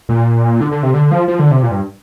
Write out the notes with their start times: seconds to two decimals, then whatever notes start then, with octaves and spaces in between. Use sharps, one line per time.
0.09 A#2
0.61 D3
0.71 D3
0.83 C3
0.94 D3
1.11 F3
1.28 F3
1.39 D3
1.51 C3
1.63 A#2
1.71 G2